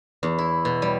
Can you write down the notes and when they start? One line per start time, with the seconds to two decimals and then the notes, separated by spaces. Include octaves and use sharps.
0.23 E2
0.38 E4
0.65 B2
0.82 G3